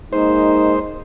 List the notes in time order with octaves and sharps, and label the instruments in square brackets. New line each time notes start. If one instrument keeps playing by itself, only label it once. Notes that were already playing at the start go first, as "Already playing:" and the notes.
[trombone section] G#3 A#3 D#4 [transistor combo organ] C5